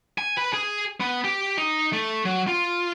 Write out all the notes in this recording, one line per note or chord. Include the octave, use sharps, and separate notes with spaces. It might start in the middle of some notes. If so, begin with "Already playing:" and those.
G#5
B4
G#4
B3
G4
D#4
A3
F#3
F4